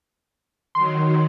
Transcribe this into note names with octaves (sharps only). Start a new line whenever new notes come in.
D#3 F#3 C6